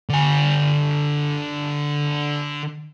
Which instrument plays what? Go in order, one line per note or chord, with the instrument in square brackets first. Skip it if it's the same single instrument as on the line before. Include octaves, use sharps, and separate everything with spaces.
[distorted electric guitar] D3 G#5